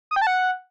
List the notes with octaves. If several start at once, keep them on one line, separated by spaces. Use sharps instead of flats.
D#6
G5
A5
F#5